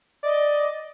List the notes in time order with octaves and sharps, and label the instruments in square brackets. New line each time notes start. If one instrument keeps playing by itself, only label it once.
[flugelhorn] D5 [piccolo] D#5